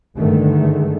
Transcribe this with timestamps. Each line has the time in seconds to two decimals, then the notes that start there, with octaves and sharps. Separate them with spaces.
0.16 G2 D3 D#3 G#3 A3